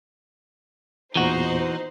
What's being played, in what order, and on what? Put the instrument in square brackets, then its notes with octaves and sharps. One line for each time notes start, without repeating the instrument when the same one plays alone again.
[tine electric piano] E2 A#2 [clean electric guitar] E3 F#4 [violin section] D#4 C5